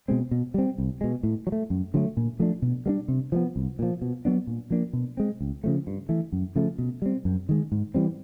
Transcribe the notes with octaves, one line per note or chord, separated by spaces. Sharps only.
B2 G#3 C4
B2
G3 C4
C2
B2 G#3
A2
F#3
A3
F#2
D3 F#3 A3
A#2
F3 A3 D4
B2
G3 A#3 D4
C3
F3 G#3 B3
C2
A#2 F3
B2
F#3 B3 D4
A#2
F3 A#3 D4
B2
G#3 C4
C#2
C#3 F3 A3
G2
E3 A3
F#2
C#3 F3 A3
B2
G3 C4
F#2
D#3 G#3
G#2
E3 G3 C4